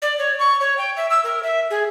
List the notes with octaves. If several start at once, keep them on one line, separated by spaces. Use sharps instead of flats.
D5
C#5
C#6
C#5
G5
E5
E6
A#4
E5
G#4